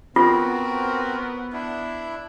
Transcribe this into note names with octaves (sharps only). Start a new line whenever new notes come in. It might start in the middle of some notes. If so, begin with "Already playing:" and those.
B3 C4 F4 F#4 A#4
D4 E4